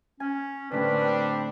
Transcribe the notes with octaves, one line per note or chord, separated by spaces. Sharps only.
C#4 G#5
A2 D3 G3 C4 D4 B4